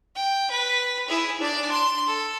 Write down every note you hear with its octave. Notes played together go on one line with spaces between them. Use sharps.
G5
B4
E4 G#4
D4 D5
C6
A4